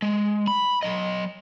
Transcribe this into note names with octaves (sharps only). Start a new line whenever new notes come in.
G#3
B5
F#3 D#5